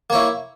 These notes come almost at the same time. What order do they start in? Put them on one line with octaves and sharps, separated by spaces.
A#3 C#5 E4